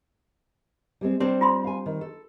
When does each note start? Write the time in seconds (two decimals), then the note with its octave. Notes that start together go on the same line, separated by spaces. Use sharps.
1.01 G3 G#3 C4
1.20 G3 C4 D4 C5 C#5
1.41 F4 B5 C6
1.64 F5 G#5
1.86 D#3
2.01 A4